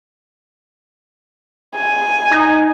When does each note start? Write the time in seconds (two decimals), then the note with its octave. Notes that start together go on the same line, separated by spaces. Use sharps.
1.75 G#5
2.31 D#4